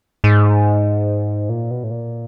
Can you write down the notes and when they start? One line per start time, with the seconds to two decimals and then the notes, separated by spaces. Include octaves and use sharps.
0.24 G#2
1.49 A#2
1.71 B2
1.84 A2
1.91 A#2